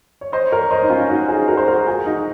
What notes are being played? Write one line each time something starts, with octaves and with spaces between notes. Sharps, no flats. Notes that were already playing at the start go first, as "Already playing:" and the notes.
C#5
C5 D#5
A#4 C#5
C5 D#5
D#4
C#4 F4
D#4 F#4
F4 G#4
F#4 A#4
C5
F#4 A#4
F4 G#4
D#4 F#4